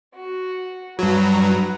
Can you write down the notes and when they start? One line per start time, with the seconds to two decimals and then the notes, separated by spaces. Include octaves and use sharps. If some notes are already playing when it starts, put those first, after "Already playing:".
0.14 F#4
0.99 G2 F#3 B4 F#5 A#5